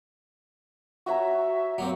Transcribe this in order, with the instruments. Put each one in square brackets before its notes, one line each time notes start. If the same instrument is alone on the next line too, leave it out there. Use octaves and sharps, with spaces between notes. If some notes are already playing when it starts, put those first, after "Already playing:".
[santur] F#4 C#5 A#5 [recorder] E5
[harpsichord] F#3 A#3 C4